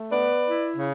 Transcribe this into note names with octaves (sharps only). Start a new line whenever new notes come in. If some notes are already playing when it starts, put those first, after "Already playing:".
Already playing: A3
B3 B4 D5
E4
C#3